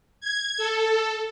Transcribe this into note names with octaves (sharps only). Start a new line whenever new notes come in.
G#6
A4